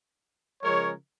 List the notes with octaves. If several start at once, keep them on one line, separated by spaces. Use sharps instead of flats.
C#3 F3 G#3 A#4 C#5